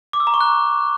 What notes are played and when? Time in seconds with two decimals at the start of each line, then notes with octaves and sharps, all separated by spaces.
0.13 D6
0.20 E6
0.27 A#5
0.34 C#6
0.41 F#6